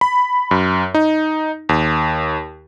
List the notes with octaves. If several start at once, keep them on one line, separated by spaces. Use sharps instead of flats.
B5
F#2
D#4
D#2